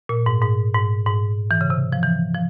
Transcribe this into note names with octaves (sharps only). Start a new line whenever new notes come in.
A#2
G#2
G#2
G#2
G#2
E3
C#3
C3
F3
E3
F3